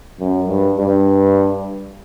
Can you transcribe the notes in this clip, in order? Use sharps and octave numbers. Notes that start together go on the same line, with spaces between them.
F#2
G2
G2